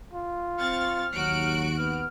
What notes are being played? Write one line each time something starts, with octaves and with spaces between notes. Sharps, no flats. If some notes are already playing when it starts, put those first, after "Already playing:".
F4
C4 C#6 F6 A6
D#2 F#3 F#4 F#6 D7
B3 F6